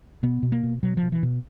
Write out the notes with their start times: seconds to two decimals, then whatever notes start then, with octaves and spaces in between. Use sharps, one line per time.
0.23 B2 B3
0.43 B2
0.52 A#3
0.63 B2
0.83 B2 F#3
0.97 F3
1.03 B2
1.12 E3
1.23 B2